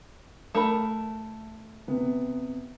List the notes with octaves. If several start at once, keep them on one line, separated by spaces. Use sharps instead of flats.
A3 A#4 B5
C3 B3